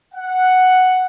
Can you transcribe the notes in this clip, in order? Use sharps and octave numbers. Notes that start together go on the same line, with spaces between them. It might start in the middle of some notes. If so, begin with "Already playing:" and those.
F#5